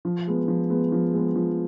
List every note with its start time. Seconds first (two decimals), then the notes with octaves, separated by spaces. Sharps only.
0.05 F3
0.27 G#3 B3
0.48 F3
0.70 G#3 B3
0.92 F3
1.14 G#3 B3
1.35 F3